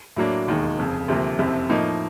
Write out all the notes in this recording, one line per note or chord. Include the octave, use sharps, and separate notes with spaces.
A2 F#3 A#3 D4
E1 D#2 D#3 G#3
F1 F2 C#3
D2 C3 F3 A#3
F#1 F2 C3
A2 F3 A#3 D#4